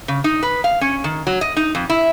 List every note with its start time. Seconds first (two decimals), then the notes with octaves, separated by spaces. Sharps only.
0.08 C#3
0.24 D#4
0.43 B4
0.64 F5
0.81 C#4
1.04 D#3
1.27 F#3
1.41 D#5
1.57 D#4
1.75 F2
1.89 E4